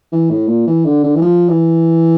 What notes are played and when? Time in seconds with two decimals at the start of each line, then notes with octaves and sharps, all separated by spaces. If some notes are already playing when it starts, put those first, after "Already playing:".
0.12 E3
0.30 A2
0.48 A#2
0.67 E3
0.85 D3
1.04 D3
1.16 E3
1.22 F3
1.49 E3